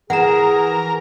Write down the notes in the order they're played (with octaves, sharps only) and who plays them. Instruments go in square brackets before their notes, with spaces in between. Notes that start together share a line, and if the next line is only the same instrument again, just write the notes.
[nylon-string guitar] E3 [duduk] G#4 [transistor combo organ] A#4 [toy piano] F#5 A#5